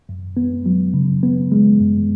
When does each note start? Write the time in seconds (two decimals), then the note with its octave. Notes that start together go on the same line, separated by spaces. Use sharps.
0.09 F#2
0.37 B3
0.66 F#3
0.94 C#3
1.23 B3
1.52 G#3
1.80 F#2